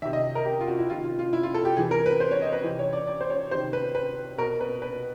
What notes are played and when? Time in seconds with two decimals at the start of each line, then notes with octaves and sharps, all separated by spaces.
0.02 C3 D#3 E5
0.13 D#5
0.35 A#4
0.45 G4
0.61 F4
0.68 F#4
0.79 E4
0.90 C3 D#3 F4
1.04 F4
1.19 F4
1.33 E4
1.43 F4
1.54 A4
1.65 G4
1.77 C3 E3 G#4
1.91 A#4
2.06 B4
2.20 C5
2.31 C#5
2.42 D#5
2.53 B4
2.64 C3 E3
2.79 C#5
2.93 D5
3.07 D5
3.21 C5
3.30 C#5
3.51 C3 D#3 C5
3.73 B4
3.95 B4
4.38 B2 A#4
4.61 B4
4.82 B4